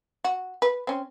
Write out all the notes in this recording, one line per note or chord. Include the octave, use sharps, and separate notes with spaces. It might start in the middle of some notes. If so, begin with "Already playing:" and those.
F#4
B4
C4 C#4